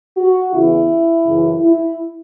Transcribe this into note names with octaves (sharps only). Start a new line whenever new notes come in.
F#4
E2 C#3 E3 E4
F#2 C#3 E3
E4